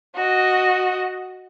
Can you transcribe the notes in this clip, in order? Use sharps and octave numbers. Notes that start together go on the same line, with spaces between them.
F#4 D#5